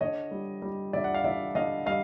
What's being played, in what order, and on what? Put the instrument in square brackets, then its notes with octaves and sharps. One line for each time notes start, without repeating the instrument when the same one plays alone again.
[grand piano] D3 C#5 D#5
G3
G3
D3 D5 E5
F#5
F5
D3 D5 E5
D3 D#5 F5
G3 D#5 F5